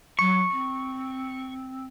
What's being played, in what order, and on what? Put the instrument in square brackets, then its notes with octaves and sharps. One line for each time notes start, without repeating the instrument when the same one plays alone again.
[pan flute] F#3 [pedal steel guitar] C#6
[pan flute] C4